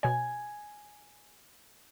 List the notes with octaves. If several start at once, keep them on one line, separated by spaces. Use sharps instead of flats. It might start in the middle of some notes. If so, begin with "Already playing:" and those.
B2 C#5 G#5